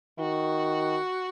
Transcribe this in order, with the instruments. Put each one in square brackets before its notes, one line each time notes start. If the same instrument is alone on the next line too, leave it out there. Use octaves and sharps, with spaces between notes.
[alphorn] D#3 [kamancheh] F#4